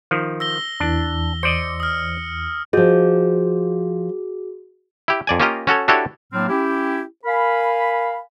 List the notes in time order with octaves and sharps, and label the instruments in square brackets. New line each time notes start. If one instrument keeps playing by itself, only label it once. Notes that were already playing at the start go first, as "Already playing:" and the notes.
[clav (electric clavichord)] D#3 F3
[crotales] E6 A#6 G7
[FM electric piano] E2 E3 [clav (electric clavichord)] D4
[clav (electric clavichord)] C5 D5 D#5 [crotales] C#7
[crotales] D#6 F6
[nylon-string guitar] F3 D#5 [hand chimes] F#4 G#4
[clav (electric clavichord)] E4 G4
F2 D5 G#5
A#3 C#4 F4 G4 D#5 A#5
C#4 F#4 A4 C#5
D4 E4 F#4 G4 A4 C#5
[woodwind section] A2 F#3 A#3 C4 D4 F6
C#4 E4 G4
A#4 F5 G#5 B5